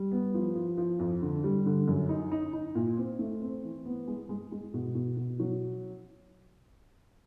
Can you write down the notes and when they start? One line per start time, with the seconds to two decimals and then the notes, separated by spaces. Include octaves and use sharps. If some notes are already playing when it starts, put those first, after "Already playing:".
Already playing: G3
0.11 B3
0.34 F3
0.56 F3
0.77 F3
0.99 F2
1.22 D3
1.44 G3
1.66 D3
1.88 F#2
2.09 D#4
2.32 D#4
2.53 D#4
2.75 A#2
2.97 C4
3.19 A3
3.42 C4
3.64 E3
3.85 B3
4.08 G#3
4.29 G#3
4.52 G#3
4.74 B2
4.95 B2
5.17 B2
5.40 F#3